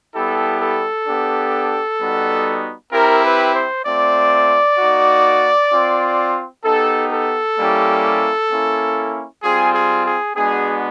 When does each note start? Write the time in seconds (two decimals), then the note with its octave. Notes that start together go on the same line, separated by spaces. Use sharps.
0.14 G3 B3 E4 G4 A4
0.60 A4
1.07 B3 D4 G4
2.00 G3 B3 D#4 F#4
2.92 C4 E4 G4 A#4
3.23 B4
3.54 C5
3.85 A3 C4 F4 D5
4.78 A#3 D#4 F#4
5.71 C4 F4
6.63 B3 D#4 G4 A4
7.11 A4
7.57 G3 A#3 C#4 E4 G4
8.50 A#3 C#4 E4
9.43 G3 C4 F4 G#4
9.74 G#4
10.05 G#4
10.36 G#3 B3 D4 F#4 G#4